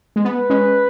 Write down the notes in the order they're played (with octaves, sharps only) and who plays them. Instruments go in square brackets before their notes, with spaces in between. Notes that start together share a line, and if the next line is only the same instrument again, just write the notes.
[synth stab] G#3
[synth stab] B3 [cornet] B4
[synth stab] G#3 C#4